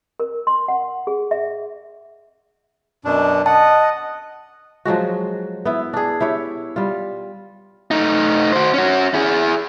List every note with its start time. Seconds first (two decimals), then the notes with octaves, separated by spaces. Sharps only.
0.20 A#4
0.47 C6
0.68 F#5
1.07 G#4
1.31 E5
3.05 F#2 B2 D4
3.46 D#5 F#5 A5
4.85 F3 F#3 G#3 F#4
5.65 B3 E4
5.93 D4 G#4
6.21 E4 G4 C#5
6.76 G3 F4
7.91 A3 D#4
8.53 F#4 C5
8.74 C#4 F#4
9.14 E4 G#4